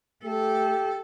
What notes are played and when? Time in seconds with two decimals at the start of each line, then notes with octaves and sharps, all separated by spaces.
0.24 A3 G4 A4